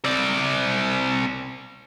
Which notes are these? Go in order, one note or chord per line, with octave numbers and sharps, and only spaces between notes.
C4 D5